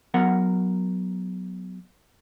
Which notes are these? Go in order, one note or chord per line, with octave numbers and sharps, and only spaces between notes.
F#3 B3 A#4 F#5